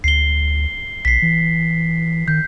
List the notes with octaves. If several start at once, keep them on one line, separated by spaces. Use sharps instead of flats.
D2 C7 G7
B1 B6 C7
E3
D#3 G6